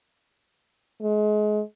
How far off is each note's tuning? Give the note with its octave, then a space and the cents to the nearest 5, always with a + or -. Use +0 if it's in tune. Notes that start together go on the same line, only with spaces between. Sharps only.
G#3 +30